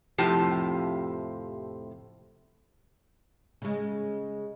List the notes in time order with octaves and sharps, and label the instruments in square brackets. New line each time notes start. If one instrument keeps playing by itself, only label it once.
[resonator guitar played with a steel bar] F2 A2 C3 F3 G4 A5
[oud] C#3 G#3